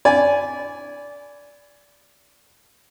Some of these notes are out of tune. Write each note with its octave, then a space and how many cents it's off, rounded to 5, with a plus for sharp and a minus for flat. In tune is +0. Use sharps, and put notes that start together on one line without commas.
D5 -20 G#5 +0 B5 +15